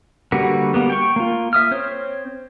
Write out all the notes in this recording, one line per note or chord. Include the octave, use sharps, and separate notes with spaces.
D3 G3 A#3 F#4 B4
G3 A#3 B3
G5 C#6
A#3 F4
E5 D#6 F6
C4 C5 C#5